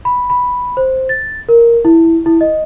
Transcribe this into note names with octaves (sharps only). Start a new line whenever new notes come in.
B5
B5
C5
A6
A#4
E4
E4
D#5